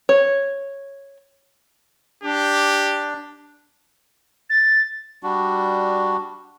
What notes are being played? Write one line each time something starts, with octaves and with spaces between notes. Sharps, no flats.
C#5
D4 G4
A6
G3 D4 F#4